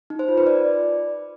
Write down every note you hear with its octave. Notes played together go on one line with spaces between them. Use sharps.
D#4
C5
F4
B4
D5